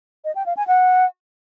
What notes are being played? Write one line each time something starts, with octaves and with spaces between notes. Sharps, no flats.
D#5
G5
F5
G#5
F#5